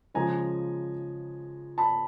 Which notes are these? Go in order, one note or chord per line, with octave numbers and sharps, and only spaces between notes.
C#3 F3 G#3 G#5 A#5
A5 B5